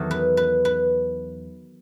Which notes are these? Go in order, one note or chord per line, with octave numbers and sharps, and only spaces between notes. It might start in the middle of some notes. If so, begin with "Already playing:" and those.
Already playing: E2 D#3 F#3 A4
B4
B4
B4